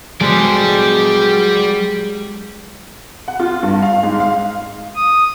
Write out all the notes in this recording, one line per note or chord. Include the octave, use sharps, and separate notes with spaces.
F#3 G#3 G4 A4 D5
F#5
F4
G2
F5
G#2
F5
D#6